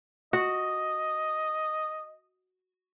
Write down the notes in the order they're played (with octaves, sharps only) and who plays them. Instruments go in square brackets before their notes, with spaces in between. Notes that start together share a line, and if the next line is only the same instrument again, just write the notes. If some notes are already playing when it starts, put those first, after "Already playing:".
[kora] F#4 [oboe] D#5